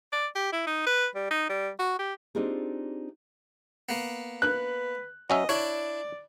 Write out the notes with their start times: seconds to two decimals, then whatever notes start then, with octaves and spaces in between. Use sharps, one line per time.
0.13 D5
0.36 G4
0.53 E4
0.67 D#4
0.87 B4
1.15 G3
1.31 D#4
1.49 G3
1.79 F#4
1.99 G4
2.35 C4 D4 D#4 F4 G4 G#4
3.89 A#3 B3
4.42 B4 F#6
5.30 F#3 C#4 D#5 E5
5.49 D4 E4 C#5 D5